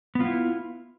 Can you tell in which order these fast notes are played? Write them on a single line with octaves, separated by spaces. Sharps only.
B3 F4 E4